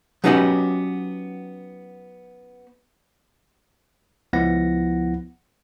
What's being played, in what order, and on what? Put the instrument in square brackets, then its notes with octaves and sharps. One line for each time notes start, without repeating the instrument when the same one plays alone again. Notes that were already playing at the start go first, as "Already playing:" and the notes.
[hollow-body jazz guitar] F#3 B3 C#4 D#4 F#4 G4
[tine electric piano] C#2 F3 B3 E4 F#5 A#6